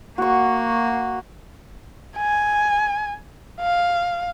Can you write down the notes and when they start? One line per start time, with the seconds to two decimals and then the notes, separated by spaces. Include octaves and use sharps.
0.18 A#3 F#4 C#6
2.18 G#5
3.61 F5